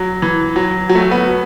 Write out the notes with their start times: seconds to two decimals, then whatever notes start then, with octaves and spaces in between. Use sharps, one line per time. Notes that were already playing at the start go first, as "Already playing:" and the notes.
Already playing: F#3
0.22 E3
0.56 F#3
0.89 F#3
0.95 A3
1.01 F#3
1.11 B3